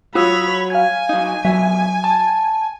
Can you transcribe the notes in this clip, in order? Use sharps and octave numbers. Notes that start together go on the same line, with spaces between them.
F#3 F4 F#4 C#5 B5 D#6 E6
F5 G#5 G#6
F#3 D#4
B1 F2 F#3 E5
A5